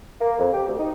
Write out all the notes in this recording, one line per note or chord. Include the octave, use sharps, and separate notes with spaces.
A#3
F2
G4
D2
D#4